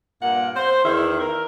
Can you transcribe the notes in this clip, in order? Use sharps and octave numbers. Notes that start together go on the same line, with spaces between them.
G2 A#2 A#3 F#5
C5
E2 D#3 E4 E5
A#4